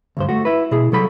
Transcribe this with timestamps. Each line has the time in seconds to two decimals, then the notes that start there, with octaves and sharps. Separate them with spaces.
0.17 D2 G2 C5
0.29 A3 F#4
0.45 E4 B4
0.71 B2 E4 G#4
0.92 C2 F#3 A4 B5